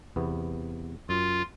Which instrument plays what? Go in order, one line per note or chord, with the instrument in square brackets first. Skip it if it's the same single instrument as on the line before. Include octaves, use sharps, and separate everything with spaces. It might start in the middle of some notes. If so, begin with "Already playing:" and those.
[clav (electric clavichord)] E2 C3 B3
[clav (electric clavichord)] F#2 [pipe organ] F4